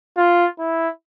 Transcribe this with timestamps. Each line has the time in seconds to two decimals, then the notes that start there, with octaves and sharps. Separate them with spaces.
0.17 F4
0.59 E4